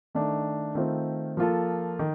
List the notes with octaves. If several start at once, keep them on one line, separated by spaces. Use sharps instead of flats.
D#3 A3 D4
D#3 A3 C4 F4
F3 A#3 F4 A4
D#3